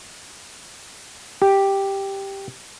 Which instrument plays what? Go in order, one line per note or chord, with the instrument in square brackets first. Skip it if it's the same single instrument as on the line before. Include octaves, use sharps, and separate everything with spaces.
[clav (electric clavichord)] G4